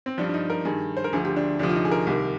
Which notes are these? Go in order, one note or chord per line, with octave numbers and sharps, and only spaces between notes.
C4
G2 F3 D4
D4
D#4
A#4
G2 D#3 G#4
C5
A#4
D2 D3 F3 G#4
G4
D4
D2 C3 F3 D4
F4
D#4
G#4
A#4
C2 C3 D#3